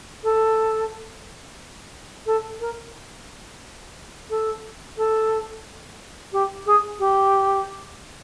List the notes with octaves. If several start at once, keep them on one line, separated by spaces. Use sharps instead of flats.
A4
A4
A#4
A4
A4
G4
G#4
G4